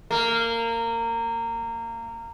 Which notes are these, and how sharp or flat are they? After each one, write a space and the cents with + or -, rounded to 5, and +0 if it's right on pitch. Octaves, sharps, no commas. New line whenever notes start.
A#3 -20